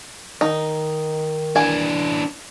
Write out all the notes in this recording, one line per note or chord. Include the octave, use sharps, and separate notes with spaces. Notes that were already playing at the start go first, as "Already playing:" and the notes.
D#3 D#4
E3 D4 G#5